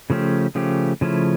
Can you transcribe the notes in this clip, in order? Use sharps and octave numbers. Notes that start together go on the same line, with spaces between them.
C#3 F3 A3 C#4 G4
C#3 F3 A3 C#4 G4
C#3 F3 A3 C#4 E4